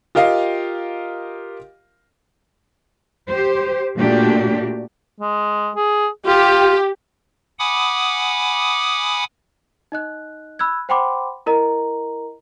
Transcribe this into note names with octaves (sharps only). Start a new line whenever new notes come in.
F4 G4 A#4 D#5 F5
G4 C5
A#2 A3 D4 F#4 G4
G#3
G#4
F4 G4
F#5 G#5 B5 D6 D#6
D#4 D#5 F#6
B5 E6 F#6 G#6
C5 F#5 G5 B5 C6 D6
E4 A#4 D#5 A#5